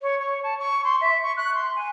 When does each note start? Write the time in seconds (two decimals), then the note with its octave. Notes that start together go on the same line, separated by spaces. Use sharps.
0.01 C#5
0.19 C#5
0.43 A5
0.59 C#6
0.84 C6
1.01 E5
1.23 C#6
1.37 F#6
1.55 C6
1.76 G#5